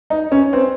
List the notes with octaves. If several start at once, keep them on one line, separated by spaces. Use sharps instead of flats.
D#4
C#4
C4